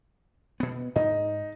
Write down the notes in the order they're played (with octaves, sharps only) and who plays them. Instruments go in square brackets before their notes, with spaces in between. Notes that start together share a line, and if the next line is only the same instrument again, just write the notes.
[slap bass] B2 B3
[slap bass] G#2 [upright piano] D#4